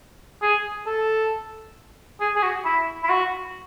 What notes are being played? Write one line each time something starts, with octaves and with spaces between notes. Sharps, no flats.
G#4
A4
G#4
G#4
F#4
E4
E4
F#4